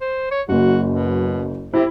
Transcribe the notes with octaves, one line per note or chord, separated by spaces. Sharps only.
C5
C#5
F#1 F#2 F#4
B2
C3 E4